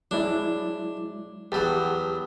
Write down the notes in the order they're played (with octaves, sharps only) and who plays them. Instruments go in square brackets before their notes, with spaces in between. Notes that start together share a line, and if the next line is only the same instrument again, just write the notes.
[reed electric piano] F#3 G#3 E4 [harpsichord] D4
[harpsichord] E2 F#3 [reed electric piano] G4 A5 B5